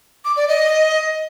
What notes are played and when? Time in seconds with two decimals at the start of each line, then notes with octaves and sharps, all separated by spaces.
0.25 D6
0.36 D5
0.48 D#5